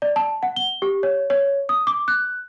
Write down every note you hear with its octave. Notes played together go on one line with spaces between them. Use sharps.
D5
A5
F#5
G7
G4
C#5
C#5
D#6
D6
F#6